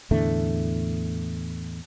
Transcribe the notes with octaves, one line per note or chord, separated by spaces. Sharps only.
E2 A2 D3 A3